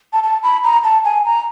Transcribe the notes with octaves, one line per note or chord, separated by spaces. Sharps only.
A5
A5
B5
A#5
A5
G#5
A#5